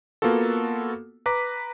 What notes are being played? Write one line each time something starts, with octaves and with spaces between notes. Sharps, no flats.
A#3 B3 F4 F#4 A4
B4 A#5 D6 B6